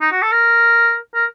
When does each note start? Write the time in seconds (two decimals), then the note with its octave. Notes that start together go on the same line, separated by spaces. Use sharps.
0.01 D#4
0.12 F#4
0.22 A4
0.32 A#4
1.15 A#4